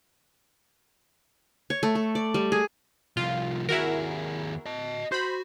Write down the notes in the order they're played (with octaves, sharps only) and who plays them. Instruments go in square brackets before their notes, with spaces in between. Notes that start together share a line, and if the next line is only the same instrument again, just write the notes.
[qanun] C#5
A3
A4
D5
G3
G#4
[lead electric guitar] C2 F3 [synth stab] F4
[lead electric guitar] D#2 G#4 [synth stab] E4 F#4 A#4
[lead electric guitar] D#5 A5
[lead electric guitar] F#4 [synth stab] C5 B5